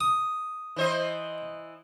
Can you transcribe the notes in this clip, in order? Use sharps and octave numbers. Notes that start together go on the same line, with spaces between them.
D#6
E3 C5 D#5